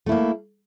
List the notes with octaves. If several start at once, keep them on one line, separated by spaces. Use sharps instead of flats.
A3 A#3 E4